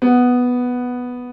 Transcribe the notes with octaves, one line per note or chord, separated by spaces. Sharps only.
B3